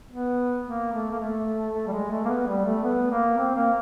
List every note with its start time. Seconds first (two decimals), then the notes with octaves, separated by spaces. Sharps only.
0.11 B3
0.65 A#3
0.92 A3
1.11 A#3
1.19 A3
1.74 A3
1.87 G3
1.92 G#3
2.10 A3
2.25 A#3
2.29 B3
2.47 G3
2.65 A3
2.84 B3
3.11 A#3
3.38 C4
3.55 A#3